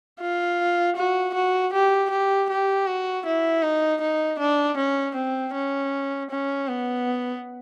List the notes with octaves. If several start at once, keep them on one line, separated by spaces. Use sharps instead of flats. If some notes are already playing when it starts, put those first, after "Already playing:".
F4
F#4
F#4
G4
G4
G4
F#4
E4
D#4
D#4
D4
C#4
C4
C#4
C#4
B3